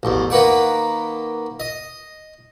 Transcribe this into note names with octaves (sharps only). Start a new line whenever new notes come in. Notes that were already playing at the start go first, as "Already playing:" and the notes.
A1 E2
D#3 A#3 B4 F#5 D6
D#5